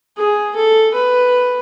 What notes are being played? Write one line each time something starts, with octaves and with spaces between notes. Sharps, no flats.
G#4
A4
B4